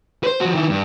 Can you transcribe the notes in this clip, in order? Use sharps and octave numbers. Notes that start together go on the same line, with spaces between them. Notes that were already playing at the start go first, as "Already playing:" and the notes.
B4 C5
F3 F#4
D#3 E4
G2